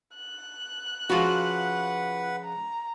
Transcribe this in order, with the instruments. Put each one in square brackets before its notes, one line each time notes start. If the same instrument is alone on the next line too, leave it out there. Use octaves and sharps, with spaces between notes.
[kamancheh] F#6
[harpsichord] C#3 F3 [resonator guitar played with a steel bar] F4 F#4 [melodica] B4 F#5
[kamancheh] A#5